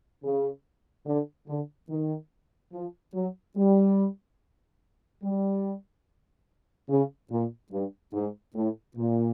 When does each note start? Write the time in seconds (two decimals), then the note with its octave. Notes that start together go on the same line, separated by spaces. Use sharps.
0.24 C#3
1.06 D3
1.48 D3
1.90 D#3
2.73 F3
3.14 F#3
3.56 G3
5.23 G3
6.88 C#3
7.30 A#2
7.72 G2
8.13 G#2
8.55 A2
8.97 A#2